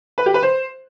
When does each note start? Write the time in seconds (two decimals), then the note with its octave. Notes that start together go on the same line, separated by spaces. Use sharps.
0.18 B4
0.26 G4
0.34 B4
0.43 C5